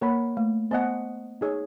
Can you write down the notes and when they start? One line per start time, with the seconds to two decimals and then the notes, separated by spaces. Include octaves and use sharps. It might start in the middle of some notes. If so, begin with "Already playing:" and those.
0.01 A#3 A#4 C#5 F#5 B5
0.37 A3
0.71 B3 C5 D#5 F#5 A5
1.41 D#4 G#4 C#5